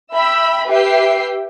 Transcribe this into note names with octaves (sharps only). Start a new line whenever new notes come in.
E5 G5 B5 E6
G4 B4 E5 G5 C7